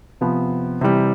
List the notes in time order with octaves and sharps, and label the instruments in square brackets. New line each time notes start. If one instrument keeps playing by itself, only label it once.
[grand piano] C3 F3 B3
C3 E3 G3